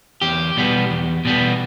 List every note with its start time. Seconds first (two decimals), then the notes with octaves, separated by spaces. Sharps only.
0.22 E2 G4
0.57 B2 G3 B3
0.91 E2
1.25 B2 G3 B3